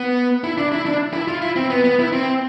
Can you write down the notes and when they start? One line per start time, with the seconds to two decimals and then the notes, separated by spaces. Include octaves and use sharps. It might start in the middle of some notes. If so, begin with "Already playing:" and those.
Already playing: B3
0.44 E4
0.58 D4
0.72 E4
0.86 D4
1.13 E4
1.28 F4
1.42 E4
1.56 C4
1.70 B3
1.84 B3
1.99 E4
2.12 C4